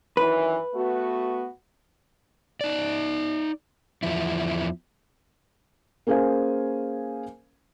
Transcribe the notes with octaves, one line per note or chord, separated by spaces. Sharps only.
F#2 D#3 E3 B4
A3 B3 F#4
D#4 D5
E2 F3 E4
A#3 C#4 G#4 C5 F5 G#5